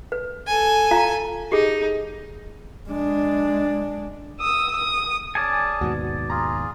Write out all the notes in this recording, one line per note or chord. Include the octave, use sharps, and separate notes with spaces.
B4
A4 G#5
F4 F5 A#5
D#4 G4 G#4
G#3 D4
D#6 E6
D#6
C#4 G#4 D5 G#5 A5
D#2 G#2 B2 F#4
F4 G#4 A#5